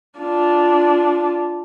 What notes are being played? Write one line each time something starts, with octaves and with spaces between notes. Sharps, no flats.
D4 F4